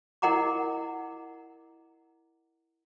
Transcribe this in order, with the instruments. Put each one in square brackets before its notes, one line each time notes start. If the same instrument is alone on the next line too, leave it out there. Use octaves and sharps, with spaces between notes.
[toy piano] E4 A#4 D#5 F#5 A#5 D6